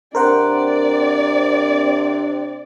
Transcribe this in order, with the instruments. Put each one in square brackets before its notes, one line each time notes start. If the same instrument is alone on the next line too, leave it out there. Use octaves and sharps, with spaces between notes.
[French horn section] C3 C4 D4 [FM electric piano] A#4 C5 F#5 [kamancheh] D5